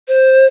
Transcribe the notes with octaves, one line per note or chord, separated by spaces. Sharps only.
C5